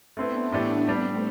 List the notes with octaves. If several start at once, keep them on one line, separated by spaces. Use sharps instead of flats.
A3 B3 C4 D4 E4 B4
A2 E3 A3 D4 G4
G3 A3 C4 D4 G4